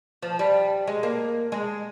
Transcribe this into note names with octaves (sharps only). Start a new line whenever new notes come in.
F3
G3
G#3
A#3
G#3